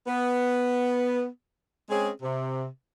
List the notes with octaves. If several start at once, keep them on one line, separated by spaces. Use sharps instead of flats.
B3
G#3 C4 C#4 G#4
C3